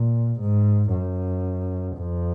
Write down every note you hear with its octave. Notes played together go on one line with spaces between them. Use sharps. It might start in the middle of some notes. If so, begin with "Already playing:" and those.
Already playing: A#2
G#2
F#2
F2